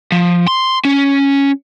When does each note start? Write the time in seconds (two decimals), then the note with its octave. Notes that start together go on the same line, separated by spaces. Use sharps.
0.12 F3
0.47 C6
0.85 C#4